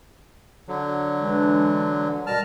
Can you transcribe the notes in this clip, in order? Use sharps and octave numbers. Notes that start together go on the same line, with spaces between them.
D3 F#3
E3 G#3 D4
B2 G3 A#4 A5 F6